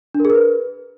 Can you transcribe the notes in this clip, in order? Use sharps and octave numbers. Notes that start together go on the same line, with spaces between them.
D4
A#4
G#4
A#4
B4